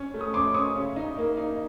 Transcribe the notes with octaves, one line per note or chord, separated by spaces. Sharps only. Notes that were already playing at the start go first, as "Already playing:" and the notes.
Already playing: C#4 C#6
A3
D#6
C#4 C6 D6
C#4 C#6 D#6
C#3
D#4
A#3
D#4